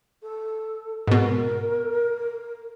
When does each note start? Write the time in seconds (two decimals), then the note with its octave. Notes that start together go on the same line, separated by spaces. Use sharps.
0.22 A4
1.07 G#2 B2 A#4